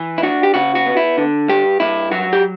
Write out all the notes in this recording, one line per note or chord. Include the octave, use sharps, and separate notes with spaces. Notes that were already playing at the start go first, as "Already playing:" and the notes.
Already playing: E3
E4
D4 F#4
G4
C#3 F#4
F#4
B3
E4
D3
G2 G4
G2 E4
F#3 F#4
G4